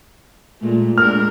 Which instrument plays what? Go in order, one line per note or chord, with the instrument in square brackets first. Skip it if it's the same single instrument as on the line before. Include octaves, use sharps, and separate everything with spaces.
[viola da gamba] A#2 G#3 A3
[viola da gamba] G#3 D4 A#4 [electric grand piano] F6